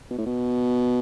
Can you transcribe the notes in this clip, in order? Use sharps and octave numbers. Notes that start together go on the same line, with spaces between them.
B2
A2
B2